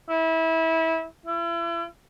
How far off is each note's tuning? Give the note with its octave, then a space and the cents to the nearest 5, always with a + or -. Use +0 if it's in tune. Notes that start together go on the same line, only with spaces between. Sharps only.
E4 -25
E4 +40